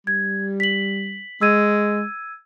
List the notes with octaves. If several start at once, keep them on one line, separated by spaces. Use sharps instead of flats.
G3 G#6
B6 F#7
G#3 E6 G#6 D#7